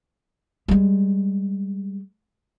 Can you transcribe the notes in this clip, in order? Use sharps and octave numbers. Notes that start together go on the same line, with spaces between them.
G3 G#3